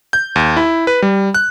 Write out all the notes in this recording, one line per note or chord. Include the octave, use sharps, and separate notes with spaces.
G6
D#2
E4
B4
G3
F#6